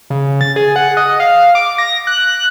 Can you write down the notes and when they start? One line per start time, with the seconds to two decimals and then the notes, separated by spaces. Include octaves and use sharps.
0.10 C#3
0.41 A6
0.56 G#4
0.76 F#5
0.97 D#5
1.20 F5
1.55 D6
1.78 A#6
2.07 F#6